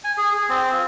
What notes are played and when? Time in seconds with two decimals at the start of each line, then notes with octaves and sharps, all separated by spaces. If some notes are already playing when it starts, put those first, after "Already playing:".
0.04 G#5
0.17 G#4
0.32 G#4
0.49 C4
0.73 F4